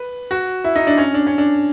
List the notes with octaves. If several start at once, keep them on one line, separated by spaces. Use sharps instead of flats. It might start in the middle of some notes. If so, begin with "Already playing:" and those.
Already playing: B4
F#4
E4
D#4
D4
C#4
D4
C#4
D4